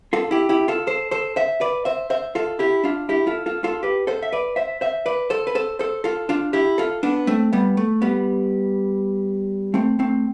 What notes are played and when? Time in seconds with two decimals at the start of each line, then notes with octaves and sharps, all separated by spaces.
0.13 F4 A4
0.31 E4 G4
0.49 E4 G4
0.68 F4 A4
0.87 A4 C5
1.11 A4 C5
1.36 C5 E5
1.61 B4 D5
1.85 C5 E5
2.10 C5 E5
2.35 F4 A4
2.59 E4 G4
2.84 D4 F4
3.09 E4 G4
3.27 F4 A4
3.46 F4 A4
3.64 F4 A4
3.83 G4 B4
4.07 A4 C5
4.22 E5
4.33 B4 D5
4.56 C5 E5
4.81 C5 E5
5.06 B4 D5
5.30 A4 C5
5.47 B4
5.55 A4 C5
5.79 A4 C5
6.04 F4 A4
6.29 D4 F4
6.53 E4 G4
6.78 F4 A4
7.03 B3 D4
7.27 A3 C4
7.53 G3 B3
7.77 A3
8.02 G3 B3
9.74 A3 C4
9.99 A3 C4